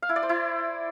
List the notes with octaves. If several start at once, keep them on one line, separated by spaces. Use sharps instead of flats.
F5
E4
D5
C5
E4